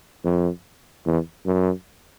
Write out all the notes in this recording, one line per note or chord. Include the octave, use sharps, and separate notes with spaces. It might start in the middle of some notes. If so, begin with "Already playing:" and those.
F2
E2
F#2